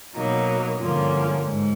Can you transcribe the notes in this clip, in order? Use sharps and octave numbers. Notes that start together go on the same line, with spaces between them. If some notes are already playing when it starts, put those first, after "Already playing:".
B2 F#3 A#3 D#4
G2 D3 F3 A#3 C#4
G#2